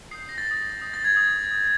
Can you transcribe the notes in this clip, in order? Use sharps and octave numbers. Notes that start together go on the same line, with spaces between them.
D#6 G6 C7
A#6
A6
D#6 G6
D#6 G6
A6
G#6
D#6 G6
D#6 G6